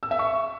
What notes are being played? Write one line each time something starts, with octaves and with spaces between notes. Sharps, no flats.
E6
E5
C#6